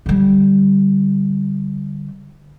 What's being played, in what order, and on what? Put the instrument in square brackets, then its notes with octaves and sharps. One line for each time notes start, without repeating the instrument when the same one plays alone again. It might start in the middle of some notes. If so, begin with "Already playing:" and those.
[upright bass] D3 G3